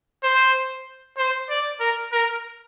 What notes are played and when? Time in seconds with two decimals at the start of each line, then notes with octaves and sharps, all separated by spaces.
0.23 C5
1.17 C5
1.50 D5
1.80 A#4
2.12 A#4